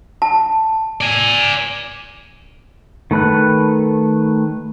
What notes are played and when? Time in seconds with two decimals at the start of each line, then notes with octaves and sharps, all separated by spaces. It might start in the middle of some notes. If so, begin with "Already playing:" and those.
0.22 A5
1.01 D5 G#5
3.11 D#3 A3 B4 A5 F#6